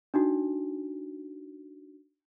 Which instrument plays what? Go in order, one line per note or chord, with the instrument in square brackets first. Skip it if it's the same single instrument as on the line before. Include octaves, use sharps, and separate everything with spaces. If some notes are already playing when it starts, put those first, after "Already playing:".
[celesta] D4 D#4 F#4